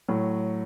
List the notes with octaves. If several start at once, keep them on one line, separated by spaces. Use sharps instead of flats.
A2 F#3